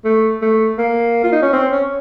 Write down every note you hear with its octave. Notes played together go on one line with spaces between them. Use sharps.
A3
A3
A#3
F4
D#4
C#4
C4
C#4